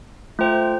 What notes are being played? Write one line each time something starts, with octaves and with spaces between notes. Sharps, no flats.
A3 F4 C5 G5